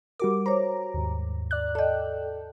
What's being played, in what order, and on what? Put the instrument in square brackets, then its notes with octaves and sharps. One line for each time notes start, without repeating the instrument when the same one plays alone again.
[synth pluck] G3 F#4 D6 [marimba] A#4
[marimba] C5 C#5 [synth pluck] A#5
[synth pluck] D#2 G#2
D5 F#6
[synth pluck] A4 G5 [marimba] D5 D#5